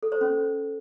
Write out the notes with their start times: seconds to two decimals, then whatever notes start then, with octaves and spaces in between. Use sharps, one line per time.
0.03 A4
0.12 C5
0.21 C#4